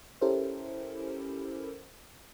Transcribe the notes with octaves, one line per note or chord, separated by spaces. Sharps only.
C#4 E4 G4 A4 A#4 C5